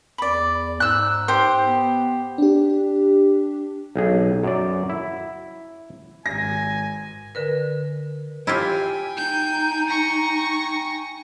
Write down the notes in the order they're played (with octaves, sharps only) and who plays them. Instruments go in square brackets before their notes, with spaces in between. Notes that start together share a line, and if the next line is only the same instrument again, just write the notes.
[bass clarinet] E2 [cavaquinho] D5 B5
[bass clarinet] G#2 [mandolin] E6 F#6
[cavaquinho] G4 C5
[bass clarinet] B3
[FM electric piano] D4 G4
[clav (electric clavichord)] B1 G#4
F#2 D5
E4
[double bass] G#1 [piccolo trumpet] G#5 [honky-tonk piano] A#6
[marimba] D3 A#4 B4
[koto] E4 F4 G4 [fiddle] G5 G#5
[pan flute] D#4 [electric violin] G6
[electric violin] C#6 A#6